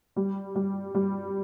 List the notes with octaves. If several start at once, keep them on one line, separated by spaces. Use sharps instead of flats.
G3
G3
G3